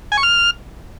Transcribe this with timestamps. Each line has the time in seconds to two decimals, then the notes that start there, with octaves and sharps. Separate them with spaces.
0.12 G#5
0.17 C#6
0.23 F6